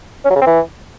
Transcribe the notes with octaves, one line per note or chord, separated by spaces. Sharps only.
C#4
F#3
C#3
C4
E3